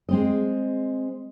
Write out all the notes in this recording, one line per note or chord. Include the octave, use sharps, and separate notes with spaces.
G#3 C4 D#5